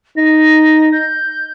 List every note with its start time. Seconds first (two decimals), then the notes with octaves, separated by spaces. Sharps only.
0.17 D#4 A#6
0.92 G6